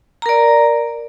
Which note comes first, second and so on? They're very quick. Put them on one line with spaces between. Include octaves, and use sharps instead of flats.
A#5 A#4 D5